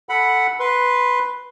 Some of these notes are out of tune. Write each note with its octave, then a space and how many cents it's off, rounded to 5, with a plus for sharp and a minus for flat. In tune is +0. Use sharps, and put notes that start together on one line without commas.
A4 +0 F#5 +0 B5 +0
B4 +0 C6 +0